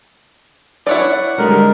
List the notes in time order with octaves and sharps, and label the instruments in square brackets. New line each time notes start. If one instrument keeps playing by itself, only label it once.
[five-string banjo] E4 C#5 D5 [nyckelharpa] F#5
[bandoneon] D3 A#4 [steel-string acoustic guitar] G3 G#3 G4